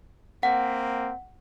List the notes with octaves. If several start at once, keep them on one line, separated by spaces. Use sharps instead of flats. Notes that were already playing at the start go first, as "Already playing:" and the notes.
A#3 C4 F#5